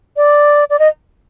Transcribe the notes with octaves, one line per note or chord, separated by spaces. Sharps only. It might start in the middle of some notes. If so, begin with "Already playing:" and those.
D5
D5
D#5